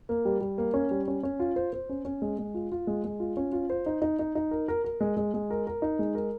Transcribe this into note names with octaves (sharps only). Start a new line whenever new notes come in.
A#3
G3
G3
A#3
C#4
G3
C#4
C#4
F4
C5
C5
C#4
C#4
G#3
G#3
F4
F4
G#3
G#3
F4
C#4
F4
C5
D#4
D#4
D#4
D#4
A#4
A#4
A#4
G#3
G#3
G#3
A#4
A#4
D#4
G#3
A#4